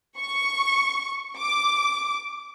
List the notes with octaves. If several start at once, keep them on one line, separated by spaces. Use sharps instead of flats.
C#6
D6